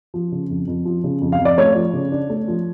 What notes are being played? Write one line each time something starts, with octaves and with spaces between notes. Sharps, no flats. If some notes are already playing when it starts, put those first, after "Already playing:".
F3
C#3
F2
F2
F3
C#3
F2
F5
F2
D5
A3 C#5
F3
C#3
D4
A3
F3